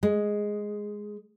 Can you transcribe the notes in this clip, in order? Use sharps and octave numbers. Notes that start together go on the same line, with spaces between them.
G#3